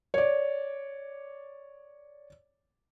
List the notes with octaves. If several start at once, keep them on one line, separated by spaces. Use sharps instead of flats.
C#5 D5